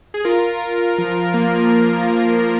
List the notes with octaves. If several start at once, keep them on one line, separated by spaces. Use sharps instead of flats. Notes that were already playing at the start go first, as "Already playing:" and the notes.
G#4
F4 A#4
F4
F3
A#3